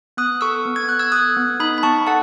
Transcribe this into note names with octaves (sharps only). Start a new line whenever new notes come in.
B3 D#6 F#6
A4 C#6 E6
B3
G#6
B3 F#6
E6 G#6
A4 D#6 F#6
B3
D#4 B5 D#6
B5
B3 A5 C#6
A4 F#5 A5